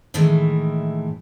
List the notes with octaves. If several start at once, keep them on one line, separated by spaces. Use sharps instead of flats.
A2 D#3 E3 G#3 A3